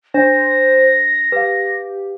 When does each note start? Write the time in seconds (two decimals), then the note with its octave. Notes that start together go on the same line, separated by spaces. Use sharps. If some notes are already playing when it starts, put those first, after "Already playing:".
0.14 D4 C5 A#6
1.32 G4 B4 F5